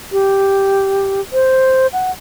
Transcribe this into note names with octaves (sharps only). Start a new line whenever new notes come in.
G4
C5
F#5